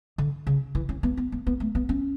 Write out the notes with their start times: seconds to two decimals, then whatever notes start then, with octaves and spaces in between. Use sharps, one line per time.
0.18 D3
0.47 C#3
0.75 E3
0.89 C#4
1.03 B3
1.17 B3
1.32 B3
1.47 B3
1.60 A3
1.75 B3
1.89 C#4